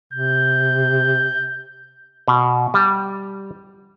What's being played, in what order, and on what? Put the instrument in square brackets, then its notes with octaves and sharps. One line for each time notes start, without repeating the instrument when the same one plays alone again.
[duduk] C3 [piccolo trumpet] G6
[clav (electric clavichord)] B2
G3